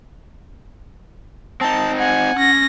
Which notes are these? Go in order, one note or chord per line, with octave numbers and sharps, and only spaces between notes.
C4 D#4 A5
F#5 G#5
C#4 A#6